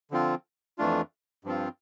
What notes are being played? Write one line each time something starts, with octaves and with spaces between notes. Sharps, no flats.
D3 F3 C4 F4
F2 E3 A3 D4 F4
G2 F3 C4 F4